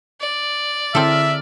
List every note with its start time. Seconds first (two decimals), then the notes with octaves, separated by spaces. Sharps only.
0.20 D5
0.95 D3 C4 E4 A4 E5 F6